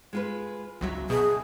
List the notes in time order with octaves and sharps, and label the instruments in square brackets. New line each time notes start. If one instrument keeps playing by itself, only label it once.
[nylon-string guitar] G#3 F4 B4
[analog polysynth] G1 C#2 F#3 [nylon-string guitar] D#4 E5
[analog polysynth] B2 [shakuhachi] G#4